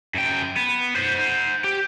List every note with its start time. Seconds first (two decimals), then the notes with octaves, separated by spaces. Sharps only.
0.15 F#2 G5
0.56 B3
0.96 C5 F#5
1.64 G4